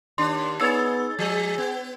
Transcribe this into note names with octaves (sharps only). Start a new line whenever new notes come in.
D#2 D4 C6
B3 D#4 G#4 C#5 E6 A6
F3 G#3 G#4
B3